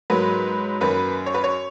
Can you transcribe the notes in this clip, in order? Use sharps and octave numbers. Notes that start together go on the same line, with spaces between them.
G#2 F#3 A#3 B4
F#2 D#3 A#3 B4
C#5
B4
C#5